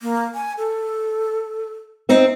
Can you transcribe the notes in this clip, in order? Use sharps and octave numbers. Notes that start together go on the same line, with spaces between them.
A#3
G#5
A4
C4 D#4 E5